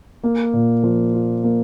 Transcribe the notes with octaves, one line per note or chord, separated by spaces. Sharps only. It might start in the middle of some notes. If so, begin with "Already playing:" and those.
A#3
A#2
F3
F4
A#3